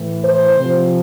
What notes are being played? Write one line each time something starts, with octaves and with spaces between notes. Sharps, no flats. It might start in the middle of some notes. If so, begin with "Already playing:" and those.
Already playing: A2 E3
C5
C3 F3